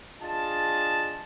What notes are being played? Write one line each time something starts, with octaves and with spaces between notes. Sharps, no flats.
D4 F4 G#4 D#5 A5